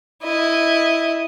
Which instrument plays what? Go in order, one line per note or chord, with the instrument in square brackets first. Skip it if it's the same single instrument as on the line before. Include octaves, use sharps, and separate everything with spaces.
[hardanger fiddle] E4 D#5